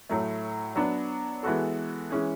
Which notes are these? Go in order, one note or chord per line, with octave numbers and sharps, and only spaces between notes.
A2 F#3 A3
F#3 B3 D4
E3 G#3 B3 F#4 A4
E3 G#3 C#4 G#4